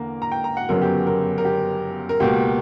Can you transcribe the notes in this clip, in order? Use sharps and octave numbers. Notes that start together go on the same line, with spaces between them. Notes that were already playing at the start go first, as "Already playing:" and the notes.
Already playing: E2 D3 A#3 A#5
A#5
G5
A#5
F#5
G1 F#2 C#3 F#3 B3 A#4
G4
A#4
A#4
G4
A#4
C#2 B2 A#3 G4